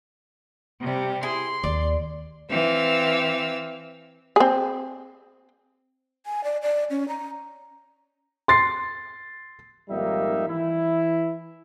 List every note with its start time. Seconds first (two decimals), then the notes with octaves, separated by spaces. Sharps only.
0.81 C3 G3
1.23 E4 G#4 C6
1.64 D#2 D5
2.50 E3 C4 F5 E6
4.36 C4 G#4
6.26 G#5
6.44 D5
6.63 D5
6.90 C#4
7.08 A#5
8.48 C6 A6 C7
9.90 G#1 F2 G3 A#3 D#4 E5
10.48 E3 E4